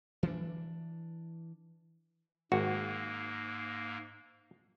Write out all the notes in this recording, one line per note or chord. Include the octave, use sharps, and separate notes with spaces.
E3 C#4 D4
G#1 G#2 A#3 F#4